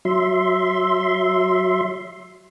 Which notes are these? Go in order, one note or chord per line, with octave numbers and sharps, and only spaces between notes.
F#3 E5 C6